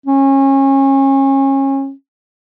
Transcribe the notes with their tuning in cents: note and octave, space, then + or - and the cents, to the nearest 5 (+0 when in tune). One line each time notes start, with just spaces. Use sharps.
C#4 -30